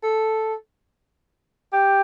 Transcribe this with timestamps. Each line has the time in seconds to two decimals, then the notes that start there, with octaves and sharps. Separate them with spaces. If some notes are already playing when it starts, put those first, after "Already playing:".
0.03 A4
1.73 G4